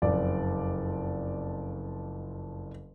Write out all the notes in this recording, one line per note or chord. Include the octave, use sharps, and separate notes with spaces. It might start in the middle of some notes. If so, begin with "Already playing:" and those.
F#1 F2 D5